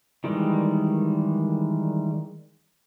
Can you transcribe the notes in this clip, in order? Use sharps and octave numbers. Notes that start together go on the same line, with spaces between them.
D#3 E3 G3 G#3